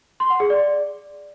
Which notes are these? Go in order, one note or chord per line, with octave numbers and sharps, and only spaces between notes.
C6
F#5
G#4
D5